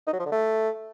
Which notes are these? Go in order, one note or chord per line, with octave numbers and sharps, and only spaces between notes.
D#4
F#3
F3
D3
A3